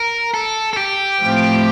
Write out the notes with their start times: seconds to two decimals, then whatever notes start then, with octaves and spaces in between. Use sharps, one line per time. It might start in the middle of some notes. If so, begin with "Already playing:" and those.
Already playing: A#4
0.34 A4
0.73 A4
0.77 G4
1.21 A2 F3 C4